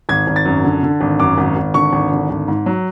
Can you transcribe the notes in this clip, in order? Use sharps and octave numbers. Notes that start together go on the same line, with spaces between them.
G#1 G#6
G#1
A6
F#2
D3
D3
G#1
F#2 D6
G#1
G#1
D3 C#6
G#1
D3
G#1
G#2
F#3